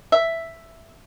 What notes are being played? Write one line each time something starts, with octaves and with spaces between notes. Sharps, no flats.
E5